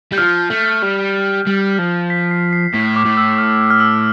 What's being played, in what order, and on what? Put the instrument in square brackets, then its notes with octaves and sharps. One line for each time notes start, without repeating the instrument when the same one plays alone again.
[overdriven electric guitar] G3 [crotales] G6
[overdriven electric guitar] F3 [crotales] F6
[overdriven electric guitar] A3
G3
G3
F3
[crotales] B6
C7
C7
[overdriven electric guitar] A2 [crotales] B6
[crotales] D6
[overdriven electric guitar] A2
[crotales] E6
F6
F6
E6